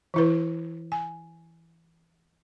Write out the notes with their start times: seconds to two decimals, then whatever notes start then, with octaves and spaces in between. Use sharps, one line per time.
0.14 E3 E4 B4
0.92 G#5